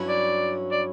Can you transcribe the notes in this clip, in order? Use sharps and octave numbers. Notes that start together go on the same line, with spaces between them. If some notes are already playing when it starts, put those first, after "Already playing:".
Already playing: G2 F#3 C#4 E4
D5
D5